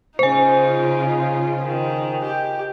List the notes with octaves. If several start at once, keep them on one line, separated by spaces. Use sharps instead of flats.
C#3 D#4 F4 C5 G#5
D#3
G4